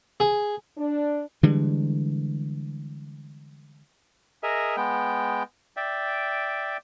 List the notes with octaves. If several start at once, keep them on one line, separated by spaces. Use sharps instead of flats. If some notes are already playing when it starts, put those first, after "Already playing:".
G#4
D4
D3 E3 G3 G#3
G#4 A#4 D#5 E5
G#3 B3 G5
D5 E5 G5